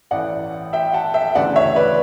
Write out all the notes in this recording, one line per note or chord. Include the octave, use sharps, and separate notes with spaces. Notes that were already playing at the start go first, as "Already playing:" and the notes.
A1 A2 E3 D5 F#5
E5 G5
F#5 A5
E5 G5
D2 C#3 E3 D5 F#5
C#5 E5
B4 D5